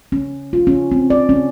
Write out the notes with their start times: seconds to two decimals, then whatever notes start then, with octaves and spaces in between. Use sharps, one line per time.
0.12 C#4
0.53 F4
0.67 C#4
0.92 C4
1.10 D5
1.29 C#4